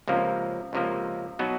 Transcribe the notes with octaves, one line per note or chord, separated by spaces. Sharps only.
C#2 C3 F3 A#3
C#2 C3 F3 A#3
B2 F#3 B3 D#4 F#4